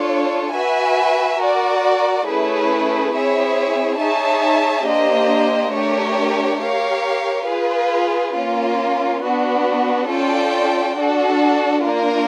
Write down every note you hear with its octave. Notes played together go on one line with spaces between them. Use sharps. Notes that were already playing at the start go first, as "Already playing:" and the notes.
Already playing: D4 F4 A4 C#5
F#4 B4 E5 G#5
F#4 A#4 D5
A3 C#4 E4 G#4 B4
C4 E4 G#4 C#5 E5
D#4 G#4 C#5 E5 A5
A#3 D4 G4 C5 D#5
A3 D4 G4 A#4 C#5
G4 A#4 C#5 F5
F4 G#4 B4
A#3 C#4 F4
B3 D4 F#4
C#4 F4 A4 D5 G5
D4 F#4 A4
A#3 D4 F4 A#4